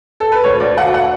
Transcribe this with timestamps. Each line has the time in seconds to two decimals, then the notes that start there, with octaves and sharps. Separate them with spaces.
0.20 A4
0.32 B4
0.44 D2 C#5
0.60 D2 D5
0.77 D2 F#5
0.94 F#5